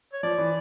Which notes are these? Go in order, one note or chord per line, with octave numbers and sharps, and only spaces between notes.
C#5
F3 D5
E3